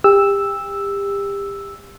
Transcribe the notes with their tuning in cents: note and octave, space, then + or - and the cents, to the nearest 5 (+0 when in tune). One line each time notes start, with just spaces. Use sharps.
G4 +30 E6 +0